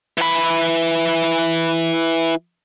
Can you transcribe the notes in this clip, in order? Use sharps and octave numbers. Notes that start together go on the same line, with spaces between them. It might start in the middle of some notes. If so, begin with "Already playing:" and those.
E3 B5